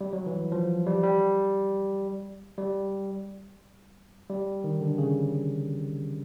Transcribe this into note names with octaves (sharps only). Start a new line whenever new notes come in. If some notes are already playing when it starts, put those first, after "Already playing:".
G3
F#3
E3
F3
G3
G3
G3
G3
D#3
D3
C#3